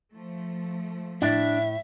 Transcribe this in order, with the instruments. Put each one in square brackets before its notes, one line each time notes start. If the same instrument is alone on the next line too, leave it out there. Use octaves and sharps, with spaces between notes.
[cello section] F3 A3
[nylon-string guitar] A2 E4 [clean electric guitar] D4 [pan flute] E5